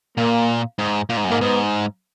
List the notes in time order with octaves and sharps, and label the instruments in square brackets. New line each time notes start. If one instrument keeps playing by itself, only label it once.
[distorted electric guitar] A#2 [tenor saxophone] A#3
[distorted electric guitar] G#2
A#2
G#2
F#2
[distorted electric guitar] G#2 [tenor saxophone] A#3
[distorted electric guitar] G#2 [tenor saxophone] B3